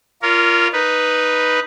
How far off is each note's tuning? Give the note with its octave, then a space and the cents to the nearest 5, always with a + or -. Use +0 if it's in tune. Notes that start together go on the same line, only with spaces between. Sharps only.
F4 -15 A#4 +0 C#5 +45
D#4 +0 B4 -5